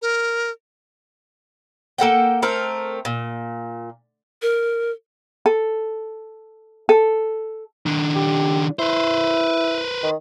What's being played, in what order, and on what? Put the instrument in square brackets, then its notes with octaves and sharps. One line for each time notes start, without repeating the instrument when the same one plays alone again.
[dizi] A#4
[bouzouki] A#3 A4 F#5 G5
A3 C4 A#4
A#2
[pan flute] A#4
[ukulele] A4
A4
[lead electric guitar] D#3 D4
[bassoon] G4
[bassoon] E4 [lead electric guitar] B4 C5
[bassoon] D#3